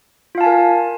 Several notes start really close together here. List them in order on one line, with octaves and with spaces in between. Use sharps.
F4 F5 A5 G#5 A#4